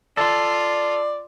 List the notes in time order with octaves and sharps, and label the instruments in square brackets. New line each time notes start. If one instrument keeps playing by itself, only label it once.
[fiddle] F4 [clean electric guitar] A4 [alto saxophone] D5